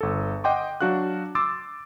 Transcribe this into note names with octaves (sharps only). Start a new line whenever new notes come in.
G1 A4
D#5 F#5 G5 C6 D6
F#3 D4 F#4 F5 F#6
C6 D6 E6 A6